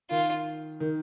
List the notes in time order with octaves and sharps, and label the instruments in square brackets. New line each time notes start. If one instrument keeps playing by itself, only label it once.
[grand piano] D#3 [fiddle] F4
[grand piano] D#3